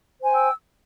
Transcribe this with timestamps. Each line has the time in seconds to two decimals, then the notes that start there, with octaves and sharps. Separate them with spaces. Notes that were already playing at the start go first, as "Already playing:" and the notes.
0.20 C5
0.25 G#5
0.30 G5
0.34 E6